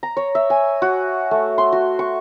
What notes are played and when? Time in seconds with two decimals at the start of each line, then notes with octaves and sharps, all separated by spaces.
0.03 A#5
0.17 C#5
0.35 E5
0.50 G#5
0.82 F#4
1.31 A3
1.58 C6
1.72 F#4
1.99 C#6